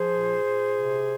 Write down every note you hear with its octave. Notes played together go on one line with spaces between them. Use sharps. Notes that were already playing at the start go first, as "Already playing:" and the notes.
Already playing: F3 G#4 C5
A#2
A#2
C3